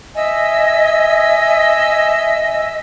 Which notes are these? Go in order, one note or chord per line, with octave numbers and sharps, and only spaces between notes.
D#5 E5 G#5 E6